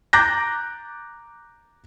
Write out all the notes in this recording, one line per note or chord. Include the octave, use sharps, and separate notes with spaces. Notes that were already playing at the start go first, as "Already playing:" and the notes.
A#5 D6 F#6 G6 A6 A#6